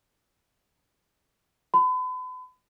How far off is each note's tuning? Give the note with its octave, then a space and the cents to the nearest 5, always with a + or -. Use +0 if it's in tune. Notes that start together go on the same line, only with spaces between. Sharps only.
B5 +40